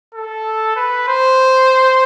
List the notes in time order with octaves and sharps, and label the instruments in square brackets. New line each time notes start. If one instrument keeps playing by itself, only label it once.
[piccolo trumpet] A4
B4
C5